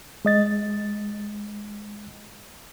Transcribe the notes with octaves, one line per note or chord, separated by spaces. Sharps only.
G#3 D#5 A6